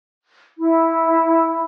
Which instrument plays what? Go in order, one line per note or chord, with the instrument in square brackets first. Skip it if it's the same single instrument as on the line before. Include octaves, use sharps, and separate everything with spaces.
[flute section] E4